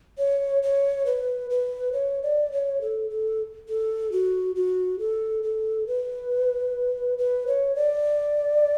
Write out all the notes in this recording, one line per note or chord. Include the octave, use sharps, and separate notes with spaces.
C#5
C#5
B4
B4
C#5
D5
C#5
A4
A4
A4
F#4
F#4
A4
A4
B4
B4
C#5
D5